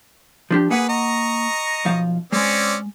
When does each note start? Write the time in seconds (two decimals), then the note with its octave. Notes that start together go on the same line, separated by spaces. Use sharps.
0.51 F3 D4 G4
0.70 A#3 G#4 B4 F#5
0.89 D#5 A#5 C#6
1.85 B1 F3 F5
2.32 G#3 C4 C#4 D5